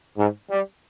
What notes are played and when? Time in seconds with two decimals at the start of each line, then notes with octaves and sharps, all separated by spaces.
0.17 G#2
0.50 G3